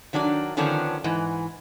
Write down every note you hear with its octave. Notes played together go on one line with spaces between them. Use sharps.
D#3 F#3 D4 G4 D5
D3 D#3 F3 B3 C#4 D4
G#2 E3